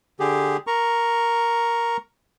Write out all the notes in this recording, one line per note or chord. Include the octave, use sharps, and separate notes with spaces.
D3 G4 G#4
A#4 A#5 C#6